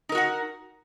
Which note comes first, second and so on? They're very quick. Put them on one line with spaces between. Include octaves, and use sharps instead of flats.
D#4 A#4 F#4 F#5